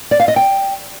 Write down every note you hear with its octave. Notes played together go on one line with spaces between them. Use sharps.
D5
F5
D#5
G5